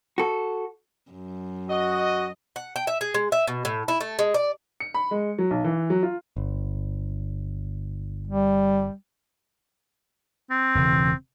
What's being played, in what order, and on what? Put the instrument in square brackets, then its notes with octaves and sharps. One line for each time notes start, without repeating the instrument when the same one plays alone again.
[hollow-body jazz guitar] F#4 A4
[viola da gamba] F#2
[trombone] F#4 [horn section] D#5
[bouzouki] F#5
G5
E5
G#4
G#3
E5
B2
A2
E4
A3
G#3
D5
[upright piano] C#7
B5
G#3
F#3
B1
E3
F#3
F4
[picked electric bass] G1
[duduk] G3
[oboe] C4
[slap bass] E1 C#3 E3